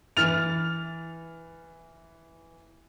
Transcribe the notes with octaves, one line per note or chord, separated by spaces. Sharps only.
E3 F6 A6 F7